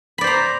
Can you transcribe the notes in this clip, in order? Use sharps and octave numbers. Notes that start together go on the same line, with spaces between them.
C5 D5 A#5 B5